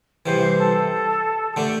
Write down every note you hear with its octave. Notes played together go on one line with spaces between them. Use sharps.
C2 C3 E3 C5
A4
A4
D3 A3 D4 G4